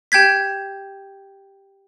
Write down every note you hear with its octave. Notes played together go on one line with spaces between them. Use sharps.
G4 G5 G6 G#6 B6